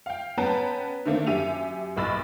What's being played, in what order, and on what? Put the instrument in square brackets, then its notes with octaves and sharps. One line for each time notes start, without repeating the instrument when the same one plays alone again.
[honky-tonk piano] F5 G5
B3 C#4 B4 G5 A5 A#5
D3 D#3 A3 A#3 C4
F#2 G4 E5 D#7 F7
F#1 B1 B5 E6 A6